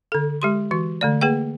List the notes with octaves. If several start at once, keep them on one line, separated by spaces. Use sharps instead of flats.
D3 A4
G#3 G4 C6
E3 F#4
D3 A3 D5
A#3 G#4 B4 G5